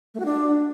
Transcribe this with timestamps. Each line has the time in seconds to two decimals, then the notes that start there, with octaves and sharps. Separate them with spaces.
0.14 A3
0.20 F#4
0.25 D4